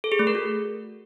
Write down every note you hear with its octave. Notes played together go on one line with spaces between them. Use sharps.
A4
G#4
A3
A#4
F#4